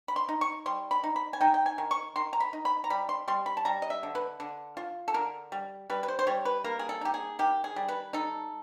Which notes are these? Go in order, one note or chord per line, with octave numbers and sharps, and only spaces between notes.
B5
C6
D#4
C#6
G3 C6
B5
D#4
B5
G#5
D#4 G5
G5
G#5
D#3
C#6
D#3 C6
A#5
B5
D#4
B5
A#5
G3 B5
C6
G3 C6
B5
A5
G3 A#5
D#5
E5
D3
B4
D3
F4
A4
D3 A#4
G3
G3 B4
B4
C5
C5
G3 C#5
B4
A#3 A#4
G#4
A4
D#4 G4
G#4
D#3 G4
G#4
G3
B4
D#4 A4